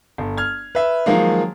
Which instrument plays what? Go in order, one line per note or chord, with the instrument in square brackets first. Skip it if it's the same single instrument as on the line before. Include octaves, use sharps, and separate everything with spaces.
[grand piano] G1
F6 G#6
B4 E5
D#3 F3 F#3 G#3 A#3